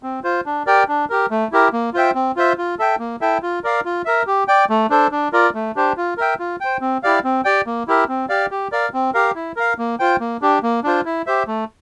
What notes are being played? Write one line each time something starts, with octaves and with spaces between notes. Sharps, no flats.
C4
F4 C5
D4
G4 A#4 D5 G5
D4
G4 A#4
A3
E4 G4 A#4
A#3
F4 C5 E5 G5
C4
F4 C5 E5
F4
A4 E5 G5
A#3
E4 A4 E5 G5
F4
A#4 D5 F5
F4
A#4 E5
G4
D5 G5
A3
D4 A4 C5
D4
F4 A#4 D5
A3
D4 G4 C5
F4
A#4 E5 G5
F4
C5 G5
C4
E4 G4 D5 F5
C4
G4 D5 G5
A#3
E4 G4 A#4 E5
C4
G4 D5 F5
G4
A#4 D5 F5
C4
G4 A#4 F5
E4
A#4 F5
A#3
F4 C5 G5
A#3
D4 G4
A#3
D4 F4 C5
E4
G4 C5 E5
A3